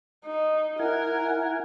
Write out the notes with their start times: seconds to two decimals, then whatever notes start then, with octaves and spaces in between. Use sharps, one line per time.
0.25 D#4
0.79 E4 A#4 F#5 G#5